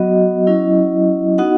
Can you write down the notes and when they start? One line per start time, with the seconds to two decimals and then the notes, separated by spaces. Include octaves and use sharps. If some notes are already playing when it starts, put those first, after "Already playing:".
Already playing: F#3 B3 F#4 D#5
0.47 F#3 C#4 E4
1.38 B3 D#4 F#4 F#5